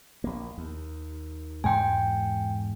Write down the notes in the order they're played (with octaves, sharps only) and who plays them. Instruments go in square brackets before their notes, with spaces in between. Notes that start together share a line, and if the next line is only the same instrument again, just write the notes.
[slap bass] A#1 A#3
D#2
[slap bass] E2 G#2 G#3 [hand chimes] G5 G#5